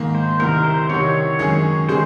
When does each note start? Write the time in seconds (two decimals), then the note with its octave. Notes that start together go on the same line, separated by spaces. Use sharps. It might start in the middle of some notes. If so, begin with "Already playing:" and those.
Already playing: G#2 D#3 A#3
0.15 C5
0.40 C2 C3 D#3 A#4
0.64 C5
0.89 C2 C3 D#3 C#5
1.39 F#2 D#3 G#3 C#4 G#4
1.89 D#3 G#3 C#4 G#4 C5